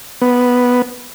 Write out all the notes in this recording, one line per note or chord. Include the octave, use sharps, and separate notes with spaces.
B3